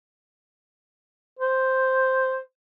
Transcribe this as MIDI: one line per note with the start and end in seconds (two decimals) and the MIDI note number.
1.39 2.39 72